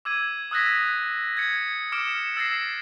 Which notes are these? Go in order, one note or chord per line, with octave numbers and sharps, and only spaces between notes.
D6 E6 G#6 D#7
D#6 E6 F#6 G#6 A#6 B6
G#6 A6 C#7
D6 F6 C#7 D7 E7
E6 A6 A#6 C7